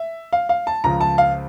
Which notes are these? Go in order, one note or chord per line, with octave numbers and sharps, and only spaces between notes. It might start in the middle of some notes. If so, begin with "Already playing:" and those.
Already playing: E5
F5
F5
A5
C#2 C#3 F3 A#5
A5
F5